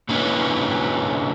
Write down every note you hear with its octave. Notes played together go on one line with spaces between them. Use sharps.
D3 A#3 C#4 E4 B4